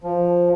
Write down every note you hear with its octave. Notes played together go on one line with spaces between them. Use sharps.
F3